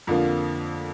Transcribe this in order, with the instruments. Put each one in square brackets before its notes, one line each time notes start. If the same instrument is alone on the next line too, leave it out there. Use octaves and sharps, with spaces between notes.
[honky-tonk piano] F2 D3 F3 A#3